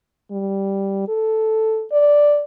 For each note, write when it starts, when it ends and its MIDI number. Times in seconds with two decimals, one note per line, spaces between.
0.31 1.08 55
1.08 1.85 69
1.92 2.44 74